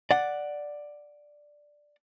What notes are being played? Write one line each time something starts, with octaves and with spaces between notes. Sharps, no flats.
D5 F#5